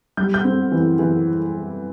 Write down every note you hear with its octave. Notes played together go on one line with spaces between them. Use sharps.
G3 G6
G6
C4
E3
E3